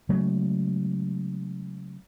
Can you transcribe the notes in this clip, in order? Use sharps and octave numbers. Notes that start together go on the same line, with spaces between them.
C#3 F#3 G#3 A3